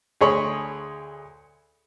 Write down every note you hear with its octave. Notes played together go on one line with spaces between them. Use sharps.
D2 G#4 C#5 B5 C6